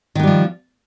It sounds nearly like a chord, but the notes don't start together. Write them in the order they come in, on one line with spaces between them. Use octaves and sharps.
D#3 B3 G3 F3